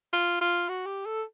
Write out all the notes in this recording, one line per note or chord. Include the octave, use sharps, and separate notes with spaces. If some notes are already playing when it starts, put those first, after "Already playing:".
F4
F4
F#4
G4
A4